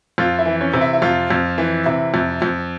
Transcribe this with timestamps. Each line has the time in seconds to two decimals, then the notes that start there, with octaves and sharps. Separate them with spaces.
0.18 F2 F4
0.39 E4
0.46 E3
0.61 C#4
0.74 C3
0.81 E4
0.93 E4
1.02 F2 F4
1.30 F2
1.58 E3
1.85 C3 E4
2.14 F2
2.42 F2